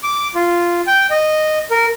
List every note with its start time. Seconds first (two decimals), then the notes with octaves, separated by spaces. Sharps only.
0.03 D6
0.35 F4
0.87 G5
1.10 D#5
1.71 A#4